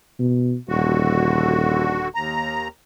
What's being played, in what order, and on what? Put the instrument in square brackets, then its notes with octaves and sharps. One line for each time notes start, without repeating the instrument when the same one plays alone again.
[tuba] B2
[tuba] D#1 [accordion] D3 F#4
[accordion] D#2 A#5